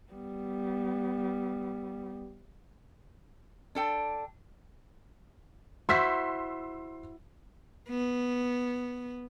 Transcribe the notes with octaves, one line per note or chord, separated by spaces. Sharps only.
G3 B3
D4 A4 G5
E4 F#4 C5 C6 E6 B6
B3